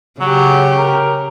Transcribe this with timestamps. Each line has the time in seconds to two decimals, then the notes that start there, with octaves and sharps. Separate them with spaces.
0.21 C#3 F#3 G4
0.79 A#4